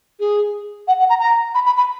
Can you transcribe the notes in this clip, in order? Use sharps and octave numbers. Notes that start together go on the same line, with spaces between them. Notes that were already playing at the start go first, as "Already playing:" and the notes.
G#4
F#5
F#5
A#5
A#5
B5
B5
B5